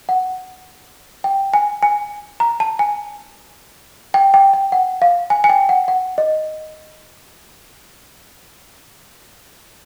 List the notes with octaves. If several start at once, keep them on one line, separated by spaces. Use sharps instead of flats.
F#5
G5
G#5
G#5
A#5
A5
G#5
G5
G5
G5
F#5
F5
G#5
G#5
G5
F#5
F#5
D#5